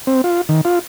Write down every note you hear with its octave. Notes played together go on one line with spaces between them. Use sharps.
C4
F4
D#3
F4